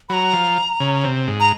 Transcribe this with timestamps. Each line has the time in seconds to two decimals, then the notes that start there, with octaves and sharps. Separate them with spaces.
0.09 F#3 A#5 B5
0.33 F3
0.80 C#3
1.04 C3
1.27 G#2
1.40 A#5